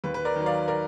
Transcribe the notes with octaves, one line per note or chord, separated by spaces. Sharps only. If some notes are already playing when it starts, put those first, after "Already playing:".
D#2 B4
B4
A#4 D5
D#3 F#3
D5 F5
A#4 D5